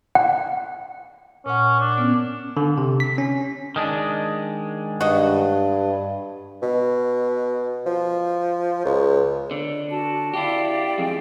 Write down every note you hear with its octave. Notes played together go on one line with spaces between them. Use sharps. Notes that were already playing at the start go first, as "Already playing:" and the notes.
F#5
A#2 C#4 F#5
D4
B3 C#4
D3
C3
B6
C#4
D#3 G#3 D4
G2 F#4 D#5
B2
F3
C#2
D3
D4 F#4 A5
E4 G4 D5 F5 G5
F2 G#3